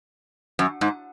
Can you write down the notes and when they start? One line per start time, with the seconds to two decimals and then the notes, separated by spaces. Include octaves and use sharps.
0.59 F#2
0.81 G#2